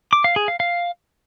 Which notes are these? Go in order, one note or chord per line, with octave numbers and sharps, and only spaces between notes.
D6
F5
G#4
F5
F5